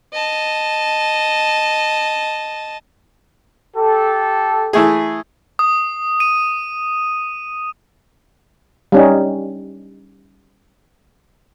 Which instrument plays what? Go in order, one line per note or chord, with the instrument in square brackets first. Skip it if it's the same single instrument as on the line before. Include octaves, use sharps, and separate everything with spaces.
[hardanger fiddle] D#5 A5
[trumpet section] G4 A4
[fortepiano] E3 A3 G#4
[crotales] D#6
D#7
[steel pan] G3 C#4 D#4